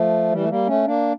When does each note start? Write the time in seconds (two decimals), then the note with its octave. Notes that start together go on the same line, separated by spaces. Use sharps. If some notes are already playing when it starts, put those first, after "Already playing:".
Already playing: F3 A3
0.31 E3 G3
0.40 A3
0.49 G3 A#3
0.67 A3 C#4
0.85 A#3 D4